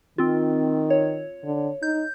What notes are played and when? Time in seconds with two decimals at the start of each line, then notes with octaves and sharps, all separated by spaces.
0.18 D#3 C4 F4
0.90 C#5
1.44 D3
1.83 D#4 G6